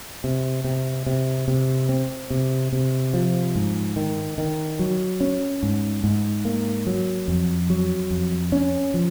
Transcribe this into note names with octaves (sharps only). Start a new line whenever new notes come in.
C3
C3
C3
C3
C4
C3
C3
F3
G#2
D#3
D#3
F#3
C#4
G#2
G#2
A#3
F#3
F2
F#3
F2
C#4
F3